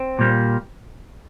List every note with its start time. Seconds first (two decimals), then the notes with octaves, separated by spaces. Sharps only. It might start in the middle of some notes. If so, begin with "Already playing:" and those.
Already playing: C4
0.19 A#2 G3 A#3